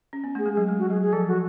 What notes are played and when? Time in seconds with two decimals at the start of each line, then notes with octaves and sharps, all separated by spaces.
0.13 C#4
0.24 B3
0.35 A3 G#4
0.46 G#3
0.53 F#3 G#4
0.68 G#3
0.79 F#4
0.90 F#3 G#4
1.02 G#4
1.13 F3 A4
1.28 F#4